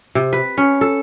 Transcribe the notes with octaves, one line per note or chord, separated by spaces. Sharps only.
C3
B4
C#4
A4